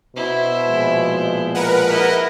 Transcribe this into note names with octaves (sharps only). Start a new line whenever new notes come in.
B2 E4 C5
A#2 F3 G#3
A#4 B4 F#5
E4 D#5